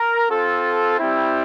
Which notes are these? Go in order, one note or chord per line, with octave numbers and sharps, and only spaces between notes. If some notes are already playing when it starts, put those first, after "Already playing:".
Already playing: A#4
C4 F4 A4
G3 C4 E4